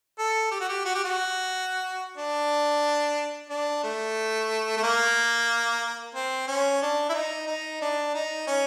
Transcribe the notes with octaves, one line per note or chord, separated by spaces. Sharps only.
A4
G4
F#4
G4
F#4
G4
F#4
D4
D4
A3
A3
A#3
C4
C#4
D4
E4
D#4
D#4
D4
D#4
C#4